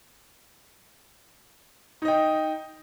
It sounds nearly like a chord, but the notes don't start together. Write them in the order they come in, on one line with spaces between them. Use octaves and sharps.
D#4 D#5 G5